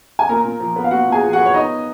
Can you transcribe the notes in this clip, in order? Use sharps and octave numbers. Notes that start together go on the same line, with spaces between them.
G#5
A#2 A#4 A#5
A#2
F3
B3
F5
A#2 F#4 F#5
A#2
G#4 G#5
F3
F#4 F#5
B3
C#5
B3 D#4 D#5